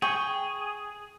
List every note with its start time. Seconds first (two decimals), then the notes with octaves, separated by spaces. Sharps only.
0.02 G#4 G5 C#6